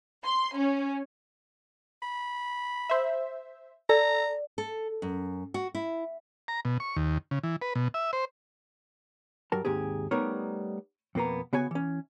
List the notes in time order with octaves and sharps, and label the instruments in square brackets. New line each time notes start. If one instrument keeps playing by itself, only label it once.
[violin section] C6
C#4
[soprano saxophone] B5
[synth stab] C5 E5
[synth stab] A4 [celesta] D5 [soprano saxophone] A#5
[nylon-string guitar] A4
F#2
F#4
E4
[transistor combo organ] A#5
B2
C#6
D#2
C#3
E3
B4
B2
E5
C5
[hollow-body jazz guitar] G2 F#3 A#4 A5
D#2 G#2 C3 G4 G#4
G3 A3 B3 D#4 A#4 C#5
F2 B2 A#3 B3 A#5
C#3 B3 F#4 C#5 G#5
E3 C#4